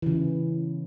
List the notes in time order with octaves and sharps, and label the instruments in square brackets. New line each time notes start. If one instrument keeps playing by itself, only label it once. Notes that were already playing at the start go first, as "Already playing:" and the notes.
[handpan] C#3 E3